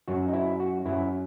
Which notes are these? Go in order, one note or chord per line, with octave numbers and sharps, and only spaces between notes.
F#2 F#3 F#4
D#4
E4
F#4
F#2 F#3 E4